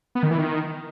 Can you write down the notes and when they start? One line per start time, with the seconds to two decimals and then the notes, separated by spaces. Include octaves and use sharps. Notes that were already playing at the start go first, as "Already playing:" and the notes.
0.15 B3
0.23 D#3
0.31 E3
0.38 D#3